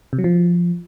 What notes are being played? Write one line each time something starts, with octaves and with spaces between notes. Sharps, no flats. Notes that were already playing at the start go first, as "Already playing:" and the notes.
C3
F#3
F3